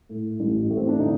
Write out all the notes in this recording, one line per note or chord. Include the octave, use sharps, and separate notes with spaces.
A2
A1
A2
C4
D4
D3 D#4